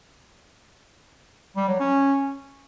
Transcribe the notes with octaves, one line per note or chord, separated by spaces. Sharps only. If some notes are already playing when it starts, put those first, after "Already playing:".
G3
F#3
C#4